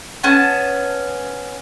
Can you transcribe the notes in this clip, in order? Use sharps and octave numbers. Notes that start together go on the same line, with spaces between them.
B3 C#4 A5